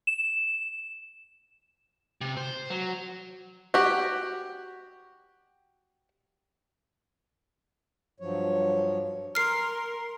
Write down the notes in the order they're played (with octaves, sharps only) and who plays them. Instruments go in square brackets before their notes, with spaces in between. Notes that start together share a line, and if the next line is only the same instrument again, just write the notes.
[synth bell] E7
[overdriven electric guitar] C3
C5
F#3
[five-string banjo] F#4 G4
[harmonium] G2 F3 F#3 C#5
[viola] A#4 C6 [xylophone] F6 C7